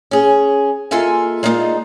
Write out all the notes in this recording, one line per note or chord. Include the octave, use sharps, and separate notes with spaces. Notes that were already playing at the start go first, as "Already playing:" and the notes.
C#4 G#4
G#3 A#3 F4 A4 E5 G#5
G#3 A#3 D4 D#4 F4